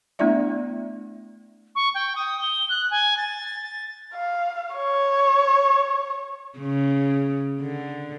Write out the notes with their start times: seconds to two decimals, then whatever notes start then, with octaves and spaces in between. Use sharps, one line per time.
0.19 A3 B3 D4 E4 D5 E5
1.75 C#6
1.95 G5
2.16 D#6
2.41 G7
2.69 F#6
2.91 G#5
3.17 A6
3.62 A6
4.14 F5
4.76 C#5
6.59 C#3
7.61 D3